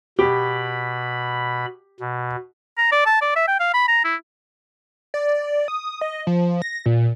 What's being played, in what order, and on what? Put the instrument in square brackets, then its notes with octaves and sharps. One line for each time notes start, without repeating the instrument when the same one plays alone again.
[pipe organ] B2 B5 [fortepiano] G4
[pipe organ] B2
[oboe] A#5
D5
A5
D5
E5
G5
F5
B5
A#5
E4
[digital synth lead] D5
D#6
D#5
F3
A#6
A#2